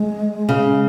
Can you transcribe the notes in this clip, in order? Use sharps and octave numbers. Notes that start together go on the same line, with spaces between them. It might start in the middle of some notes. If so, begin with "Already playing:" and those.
Already playing: G#3
C#3